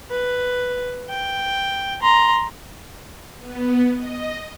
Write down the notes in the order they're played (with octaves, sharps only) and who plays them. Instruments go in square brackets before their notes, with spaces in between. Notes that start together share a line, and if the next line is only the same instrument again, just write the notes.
[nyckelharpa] B4
G5
A#5 C6
[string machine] B3
D#5